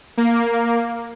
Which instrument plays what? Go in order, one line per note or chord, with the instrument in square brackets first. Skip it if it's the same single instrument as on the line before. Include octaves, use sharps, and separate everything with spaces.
[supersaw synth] A#3